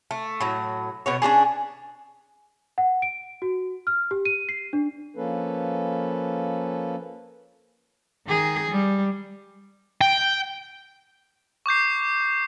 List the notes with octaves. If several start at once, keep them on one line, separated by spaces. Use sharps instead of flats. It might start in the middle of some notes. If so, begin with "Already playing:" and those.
A3
A2 F#3
B2 B3 C#5
C#4 D4 G4 G#4
F#5
D7
F#4
F6
G4
D#7
C7
D4
F3 A#3 C#4 A4 B4
D#3 G#4
G3
G5
C#6 D6 G6 C7